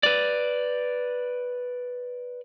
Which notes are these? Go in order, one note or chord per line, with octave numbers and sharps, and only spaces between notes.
B4 D5